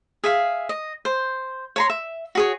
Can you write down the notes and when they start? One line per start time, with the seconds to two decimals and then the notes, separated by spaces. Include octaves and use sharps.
0.24 G#4 E5 F5
0.69 D#5
1.05 C5
1.76 C#5 A#5 C6
1.90 E5
2.35 F#4 G#4 C#5